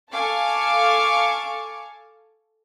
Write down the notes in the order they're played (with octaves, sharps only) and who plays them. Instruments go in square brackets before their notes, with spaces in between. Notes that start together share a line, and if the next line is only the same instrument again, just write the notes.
[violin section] A4 F5 G#5 A5 C#6 D6